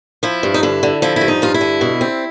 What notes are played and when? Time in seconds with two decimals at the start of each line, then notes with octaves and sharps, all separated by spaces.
0.23 F3 E4
0.43 G2
0.54 D#4
0.63 D3 E4
0.83 D3
1.02 F3 E4
1.16 G2 E4
1.28 D#4
1.42 G2 F4
1.54 E4
1.61 D3
1.81 B2
2.01 C4